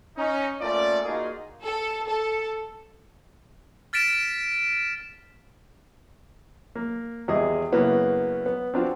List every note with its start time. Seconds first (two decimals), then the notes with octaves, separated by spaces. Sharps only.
0.17 C#4 D#4
0.61 A3 A#3 C#4 F4 D5
1.04 A#3 D#4 F4 F#4 G#4
1.63 A4
2.09 A4
3.93 F6 A6 B6 D7 E7
6.76 A#3
7.28 G#1 E2 G3 G#3 G#4 D#5
7.72 F#2 C#3 A#3 B3 E4 F#4
8.46 B3
8.74 C4 D4 F4 F#4